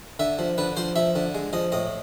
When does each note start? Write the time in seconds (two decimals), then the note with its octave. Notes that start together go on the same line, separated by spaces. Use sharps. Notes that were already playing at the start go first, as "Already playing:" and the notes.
0.19 D3 E5
0.39 F3
0.58 D3 B4
0.77 F3 C5
0.96 F3 E5
1.16 D3
1.35 G#3
1.53 F3 D#5
1.72 A2 D#5